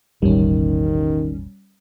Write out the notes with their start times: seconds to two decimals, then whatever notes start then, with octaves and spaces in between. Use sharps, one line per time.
0.22 E1 A1 D#3 G3 C#4